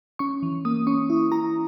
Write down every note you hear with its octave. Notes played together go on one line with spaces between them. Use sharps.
C#4 C#6
E3
A#3 D#6
C#4 C#6
E4
E4 A#5